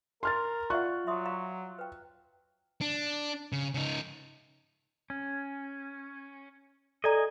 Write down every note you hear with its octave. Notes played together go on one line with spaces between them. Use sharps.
A#4 C6 F6 A6
F4 D5 E5 F#5 C#6 F#6
F#3 E5 C6 D#6
F5 A#5
B4 G5
D4
C#3
C#3 D#4
C#4
A4 D5 D#5 G#5 A#5